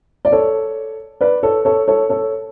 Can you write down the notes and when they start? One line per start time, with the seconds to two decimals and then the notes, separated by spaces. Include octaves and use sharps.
0.25 D5
0.32 A4 C#5
1.21 B4 D5
1.43 A4 C#5
1.65 A4 C#5
1.88 A4 C#5
2.10 A4 C#5